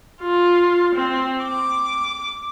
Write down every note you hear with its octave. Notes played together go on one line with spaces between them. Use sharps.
F4
C4
D6